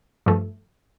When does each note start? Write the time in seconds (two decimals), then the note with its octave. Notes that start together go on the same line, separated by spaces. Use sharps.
0.26 G2 F3 A3